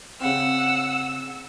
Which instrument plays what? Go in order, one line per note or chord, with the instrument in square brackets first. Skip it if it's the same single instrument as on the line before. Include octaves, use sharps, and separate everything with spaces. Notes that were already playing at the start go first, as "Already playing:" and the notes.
[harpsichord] C#3 C4 [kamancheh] F#5 [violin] E6